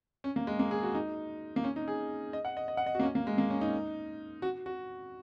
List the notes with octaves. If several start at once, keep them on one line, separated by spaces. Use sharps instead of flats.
C#4
A#3
G#3
A#3
G#4
F#4
D#4
A#3
C#4
D#4
G#4
D#5
F#5
D#5
D#5
F#5
D#5
F#4
A#3
C#4
A#3
G#3
A#3
C#4
D#4
F#4
F#4